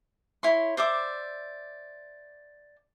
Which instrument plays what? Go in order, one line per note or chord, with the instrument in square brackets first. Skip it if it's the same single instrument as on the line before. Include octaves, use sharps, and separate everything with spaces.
[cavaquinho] E4 C#5 C6
C5 D5 E5 D6